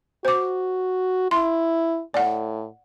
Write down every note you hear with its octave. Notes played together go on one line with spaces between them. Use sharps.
F#4 C5 D6
E4 C6
A2 D5 F#5